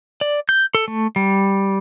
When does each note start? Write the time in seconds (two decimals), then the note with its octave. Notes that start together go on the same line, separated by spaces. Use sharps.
0.21 D5
0.49 G6
0.75 A4
0.88 A3
1.16 G3